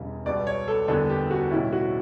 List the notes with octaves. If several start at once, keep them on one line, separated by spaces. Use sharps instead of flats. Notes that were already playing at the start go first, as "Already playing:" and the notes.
Already playing: E1 E2 C#3 G3
C#2 B2 G3 B3 D5
C#5
A4
F#1 E2 D3 G3 B3 A4
G4
F#4
B1 A2 E3 G3 C#4 E4
F#4